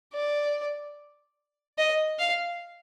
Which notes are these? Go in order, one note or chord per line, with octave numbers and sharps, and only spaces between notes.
D5
D#5
F5